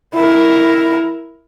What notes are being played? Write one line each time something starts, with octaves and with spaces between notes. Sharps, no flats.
E4 A#4